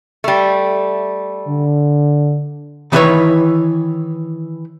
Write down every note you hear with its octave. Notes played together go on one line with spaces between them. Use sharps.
G3 A3
D3
D#3 E3 E4 G4 B4 C#5